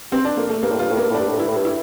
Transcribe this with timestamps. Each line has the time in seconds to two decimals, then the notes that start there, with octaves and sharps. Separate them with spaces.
0.12 G2 C4
0.25 D4
0.37 F2 A#3
0.50 A3
0.63 G2 A#3
0.72 A2
0.79 G2 F4
0.92 A2
0.97 G2 A#3
1.10 A2 D4
1.20 G2
1.29 A2
1.39 G2 E4
1.49 A2
1.58 G2
1.65 E4